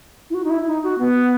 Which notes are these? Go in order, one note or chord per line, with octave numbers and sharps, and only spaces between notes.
E4
F#4
D#4
E4
D#4
F#4
B3